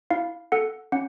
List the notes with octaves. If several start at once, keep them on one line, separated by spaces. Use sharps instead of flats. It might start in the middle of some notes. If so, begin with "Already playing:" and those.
E4 F5
A4 F#5
C#4 F#5